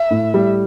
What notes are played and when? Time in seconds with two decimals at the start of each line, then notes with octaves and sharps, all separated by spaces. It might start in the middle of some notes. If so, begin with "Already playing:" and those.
Already playing: E5
0.10 A2
0.34 G3